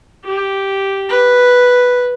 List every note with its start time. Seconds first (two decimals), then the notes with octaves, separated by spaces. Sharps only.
0.24 G4
1.10 B4